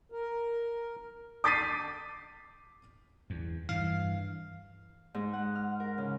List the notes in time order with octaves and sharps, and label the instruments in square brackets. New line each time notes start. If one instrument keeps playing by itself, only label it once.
[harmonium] A#4
[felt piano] D6 G6 A6 B6 C7 D#7
[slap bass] E2
[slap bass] G2 E3 [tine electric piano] F5
[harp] G#2
F#5
F6
A#4
C#3